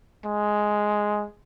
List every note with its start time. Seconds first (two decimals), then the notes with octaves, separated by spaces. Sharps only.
0.25 G#3